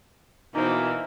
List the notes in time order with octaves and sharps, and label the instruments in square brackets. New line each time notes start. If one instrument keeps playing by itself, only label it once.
[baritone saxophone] B2 [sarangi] E3 [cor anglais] A#3 [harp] D#4 C5